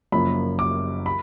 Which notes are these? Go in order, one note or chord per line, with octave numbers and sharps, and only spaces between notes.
F#1 F#2 F3 A#3 B5
D6
B5